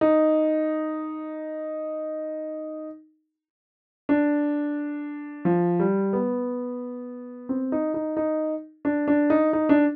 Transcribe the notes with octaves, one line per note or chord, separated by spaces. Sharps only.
D#4
D4
F3
G3
B3
C4
D#4
D#4
D#4
D4
D4
D#4
D#4
D4